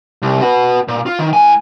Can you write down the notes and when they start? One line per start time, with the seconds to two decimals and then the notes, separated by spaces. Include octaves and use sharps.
0.22 C2
0.41 F#4 B4
0.88 A#2
1.06 F4
1.19 D#3
1.33 A2 G#5